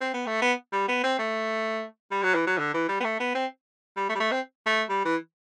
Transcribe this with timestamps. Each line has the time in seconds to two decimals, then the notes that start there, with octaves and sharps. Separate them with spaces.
0.01 C4
0.14 B3
0.27 A3
0.42 B3
0.73 G3
0.88 B3
1.04 C4
1.19 A3
2.12 G3
2.23 F#3
2.35 E3
2.47 F#3
2.58 D3
2.74 E3
2.89 G3
3.00 B3
3.04 A3
3.20 B3
3.35 C4
3.96 G3
4.09 A3
4.15 G3
4.20 A3
4.32 C4
4.66 A3
4.89 G3
5.05 E3